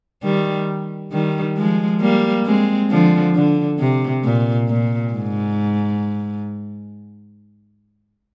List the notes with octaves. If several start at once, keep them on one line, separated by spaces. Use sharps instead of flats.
D#3 G3
D#3 G3
F3 G#3
G3 A#3
G#3 C4
D3 F3
D3
C3
A#2
A#2
G#2